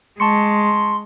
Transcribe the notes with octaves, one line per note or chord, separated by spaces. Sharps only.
G#3 A5 C6 C#6 C#7